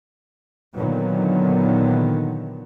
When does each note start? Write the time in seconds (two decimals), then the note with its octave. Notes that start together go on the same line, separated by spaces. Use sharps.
0.76 A#2 D3 D#3 F#3 B3